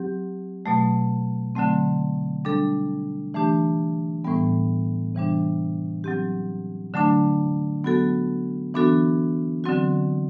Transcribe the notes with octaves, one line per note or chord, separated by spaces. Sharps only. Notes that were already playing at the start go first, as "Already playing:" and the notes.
Already playing: F#3 C4 G4
B2 F#3 A3
D3 F#3 A3 C4
G3 D4 A4
E3 A3 D4 G4
A2 E3 G3 B3
C3 E3 G3 D4
F#3 C4 G4
D3 F#3 A3 D4
F#3 B3 F#4 A4
E3 B3 D4 F#4 A4
D3 F#3 C4 F#4